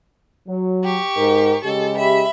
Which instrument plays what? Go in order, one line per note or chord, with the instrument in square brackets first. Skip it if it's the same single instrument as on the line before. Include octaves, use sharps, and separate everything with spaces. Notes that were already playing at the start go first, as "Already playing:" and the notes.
[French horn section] F#3
[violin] G4 C#6
[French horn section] G#2 A#4
[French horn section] C#3 G#3 G4 [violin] A4
[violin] E5 B5